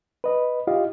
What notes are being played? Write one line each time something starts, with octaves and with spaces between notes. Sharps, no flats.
B4 D#5
E4 F4 G4 D#5 F5